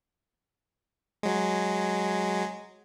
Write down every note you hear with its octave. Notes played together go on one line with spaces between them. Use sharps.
F#3 G#3